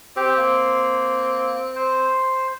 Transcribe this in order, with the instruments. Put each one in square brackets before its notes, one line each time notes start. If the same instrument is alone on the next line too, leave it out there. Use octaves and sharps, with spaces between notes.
[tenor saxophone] C4 [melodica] G4
[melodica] A#3
C5